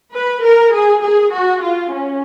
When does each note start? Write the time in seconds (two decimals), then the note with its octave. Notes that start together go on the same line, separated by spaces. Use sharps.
0.14 B4
0.44 A#4
0.73 G#4
1.03 G#4
1.33 F#4
1.63 F4
1.93 C#4